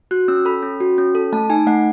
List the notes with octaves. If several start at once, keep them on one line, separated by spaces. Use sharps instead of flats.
F#4 F#6
C#4 E6
A4 B5
C#4
F#4
C#4
A4
A3 A5
D#4 G#5
A3 F#5